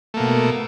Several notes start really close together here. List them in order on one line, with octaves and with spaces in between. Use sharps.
A3 A#3 B2